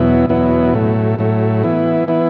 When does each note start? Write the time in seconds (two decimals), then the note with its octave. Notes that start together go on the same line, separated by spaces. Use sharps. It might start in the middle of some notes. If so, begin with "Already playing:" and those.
Already playing: E2 B2 F#3 B3 E4
0.29 E2 B2 F#3 B3 E4
0.74 A2 F#3 A3
1.19 A2 F#3 A3
1.63 E3 B3 E4
2.08 E3 B3 E4